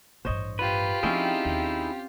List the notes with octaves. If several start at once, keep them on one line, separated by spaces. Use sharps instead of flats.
A1 G2 C5 C#5 D#5
F4 G4 B4
F3 C4 C#4 D#4 E4 G#4 G5
D#2